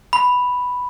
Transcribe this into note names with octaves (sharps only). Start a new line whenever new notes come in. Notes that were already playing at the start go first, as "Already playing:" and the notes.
B5